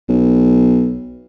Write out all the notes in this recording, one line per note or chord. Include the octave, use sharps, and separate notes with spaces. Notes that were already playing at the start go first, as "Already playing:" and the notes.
B1